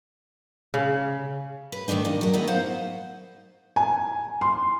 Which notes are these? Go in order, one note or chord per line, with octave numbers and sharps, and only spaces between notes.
C#3
B4
D#3 E3 A3 D4 D#4
A#2 D#5
F#3 A#4
B3 D#4 E4 D#5
C5 F5 F#5
G#5
C6